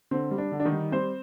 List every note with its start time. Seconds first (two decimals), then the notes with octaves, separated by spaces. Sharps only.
0.11 D3 C4
0.31 G3
0.38 D4
0.52 D3
0.60 D4
0.65 D#3 D#4
0.72 G3
0.92 G3 C4 C5